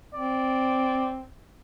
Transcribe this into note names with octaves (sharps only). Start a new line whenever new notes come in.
C4 D5